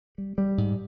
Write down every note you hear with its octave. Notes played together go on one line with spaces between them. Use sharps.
G3
G3
G#2